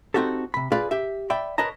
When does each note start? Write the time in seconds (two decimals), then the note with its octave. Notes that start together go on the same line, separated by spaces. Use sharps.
0.14 C4 D#4 F#4 G4 A4
0.54 C3 B5
0.72 F4 G#4 B4 D5 F5
0.91 G4 E5
1.30 D5 E5 G5 B5
1.58 A#4 B4 C#5 D#5 A5 A#5